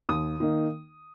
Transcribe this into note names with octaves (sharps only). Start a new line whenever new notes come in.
D#2 D#6
D#3 A#3 D#4